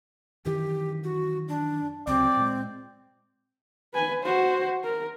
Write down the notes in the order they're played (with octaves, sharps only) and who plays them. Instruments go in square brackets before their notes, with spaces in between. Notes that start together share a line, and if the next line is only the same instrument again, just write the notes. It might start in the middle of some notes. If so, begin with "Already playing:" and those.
[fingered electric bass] F#2 D#3 E3 [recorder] G4
[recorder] F#4
D4
[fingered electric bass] C#2 C3 F#3 [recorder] C4 [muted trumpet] D5
[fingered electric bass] A#2 G#3
[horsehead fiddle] B4 G#5
F#4 C5
A#4